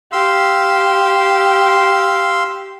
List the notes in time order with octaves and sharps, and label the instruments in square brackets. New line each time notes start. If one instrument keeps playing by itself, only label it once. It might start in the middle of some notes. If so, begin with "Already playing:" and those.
[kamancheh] G4 [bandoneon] F5 C6 E6